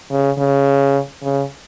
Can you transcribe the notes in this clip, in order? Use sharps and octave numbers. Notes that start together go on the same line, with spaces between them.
C#3
C#3
C#3